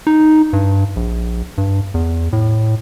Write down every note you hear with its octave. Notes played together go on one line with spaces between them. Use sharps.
D#4
G2
A#1
G2
E2
A2